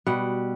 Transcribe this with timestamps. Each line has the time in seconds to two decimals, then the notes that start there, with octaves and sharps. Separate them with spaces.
0.07 B2 G3 F#5